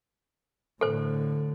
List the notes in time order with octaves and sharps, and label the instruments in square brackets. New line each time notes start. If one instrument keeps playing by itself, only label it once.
[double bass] A2 D3 [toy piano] A4 C5